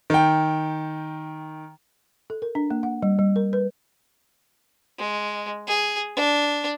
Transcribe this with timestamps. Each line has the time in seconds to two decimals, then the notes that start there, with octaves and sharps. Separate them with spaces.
0.10 D#3 G5
2.30 A4
2.42 A#4
2.55 D4
2.71 A#3
2.83 F#5
3.03 G3
3.19 G3
3.36 A#4
3.53 B4
4.98 G#3
5.67 G#4
6.16 D4